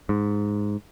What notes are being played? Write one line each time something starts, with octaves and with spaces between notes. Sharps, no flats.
G#2